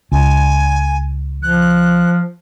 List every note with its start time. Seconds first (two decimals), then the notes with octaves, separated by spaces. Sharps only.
0.12 C#2 G#5
1.42 F3 F#6